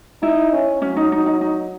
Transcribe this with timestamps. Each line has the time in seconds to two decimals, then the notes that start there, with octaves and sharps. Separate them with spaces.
0.22 D#4 E4
0.53 C#4
0.81 F#3 C#4
0.97 D#4
1.12 D#4
1.26 D#4
1.41 D#4